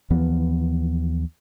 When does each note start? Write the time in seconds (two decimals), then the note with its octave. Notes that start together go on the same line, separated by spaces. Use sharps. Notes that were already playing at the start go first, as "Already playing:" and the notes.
0.10 D#2 E3 F3 B3